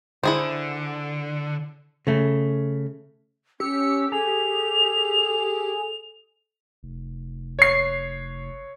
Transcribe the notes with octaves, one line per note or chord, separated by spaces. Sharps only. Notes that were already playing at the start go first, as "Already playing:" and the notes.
D3 E4 G#4 C5
C#3 A3
C#4 G4 E6 C#7
G#4 A4 F7
F1
C#5 C7